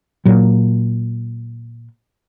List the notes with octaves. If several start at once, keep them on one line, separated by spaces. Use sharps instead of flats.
A#2 F#3